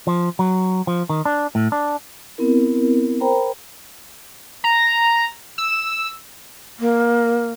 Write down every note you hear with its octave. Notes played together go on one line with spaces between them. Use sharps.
F3
F#3
F3
D#3
D4
A2
D4
B3 C4 E4 A#4
A#4 C5 G5 A#5 B5
A#5
E6
A#3